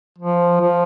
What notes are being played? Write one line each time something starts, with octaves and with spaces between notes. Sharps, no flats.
F3
F3